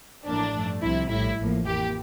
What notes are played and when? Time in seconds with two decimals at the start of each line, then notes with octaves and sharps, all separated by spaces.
0.25 A1 A2 F3 A#3 D4
0.53 G2 F3 A3
0.82 C2 C3 F3 E4
1.09 A#1 A2 G3 E4
1.38 A1 A2 F3 A#3
1.65 F2 E3 A#3 G4